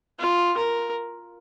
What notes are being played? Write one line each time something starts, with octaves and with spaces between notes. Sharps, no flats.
F4
A#4